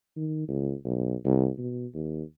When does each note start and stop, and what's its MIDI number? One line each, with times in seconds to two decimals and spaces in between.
0.16 0.44 51
0.48 0.74 37
0.85 1.15 35
1.25 1.49 36
1.58 1.86 47
1.94 2.23 39